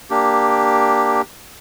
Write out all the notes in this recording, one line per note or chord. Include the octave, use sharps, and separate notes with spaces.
A#3 D4 G4